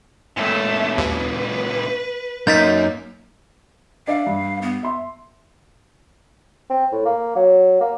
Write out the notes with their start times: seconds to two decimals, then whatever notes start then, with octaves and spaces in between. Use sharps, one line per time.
0.37 C#2 A#2 A3
0.98 D#2 B4
2.47 F#2 A#3 D#4 G6 A6 B6
4.07 D4 D5 E5 F5
4.27 G2
4.62 B3
4.83 E5 C6
6.70 C4
6.92 A2
7.05 A#3
7.36 F#3
7.81 A#3